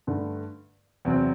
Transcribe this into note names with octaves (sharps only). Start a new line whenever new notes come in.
G2 D3 A3
E2 C3 F#3 C4